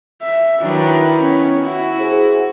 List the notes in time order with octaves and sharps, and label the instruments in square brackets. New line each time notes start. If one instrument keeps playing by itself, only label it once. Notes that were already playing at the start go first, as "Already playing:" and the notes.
[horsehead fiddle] E5
[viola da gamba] D#3 E4 B4 [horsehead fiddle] F#3 D4
[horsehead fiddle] B3 C#4
[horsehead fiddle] E4 [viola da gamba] F#4
[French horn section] G#4 C5